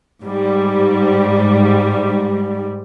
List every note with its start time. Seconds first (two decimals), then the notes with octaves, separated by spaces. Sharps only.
0.22 G#2 G3